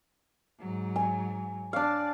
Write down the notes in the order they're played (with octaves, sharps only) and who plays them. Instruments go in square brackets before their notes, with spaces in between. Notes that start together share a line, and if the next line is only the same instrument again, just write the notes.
[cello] G#2 F#3
[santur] G#5
[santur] D4 F5 [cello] D5